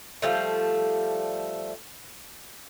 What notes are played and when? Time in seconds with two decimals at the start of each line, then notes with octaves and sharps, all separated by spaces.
0.22 F3 G3 A3